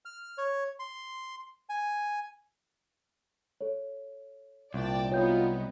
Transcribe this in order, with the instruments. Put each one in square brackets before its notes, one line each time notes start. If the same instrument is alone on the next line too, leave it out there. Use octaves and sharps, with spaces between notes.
[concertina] F6
C#5
C6
G#5
[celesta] A4 C#5
[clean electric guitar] C2 [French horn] A#2 [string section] D5 G5 A5
[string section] F#3 B3 D#4 [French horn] F4 [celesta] C#5 G5 G6